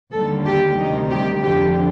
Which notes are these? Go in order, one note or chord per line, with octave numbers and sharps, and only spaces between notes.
D#2 D3 G3 A4
G4
D2 C3 D#3 G3 D#4
G4
F2 D3 F3 G4